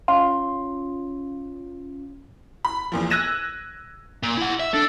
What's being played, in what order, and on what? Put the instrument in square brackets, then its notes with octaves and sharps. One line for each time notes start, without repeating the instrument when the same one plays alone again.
[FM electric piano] C#4 F4 [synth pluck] F5 [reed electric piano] C6
[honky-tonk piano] B5
E2 A#2 F3
E6 F#6 G#6 A#6 D#7 E7
[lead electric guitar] A#2
E4 F#5
E5
[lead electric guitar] D4 [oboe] A4